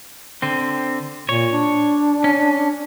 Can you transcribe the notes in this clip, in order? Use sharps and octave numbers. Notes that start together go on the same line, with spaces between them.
D3 C4
A#2 C#5
D4
C#4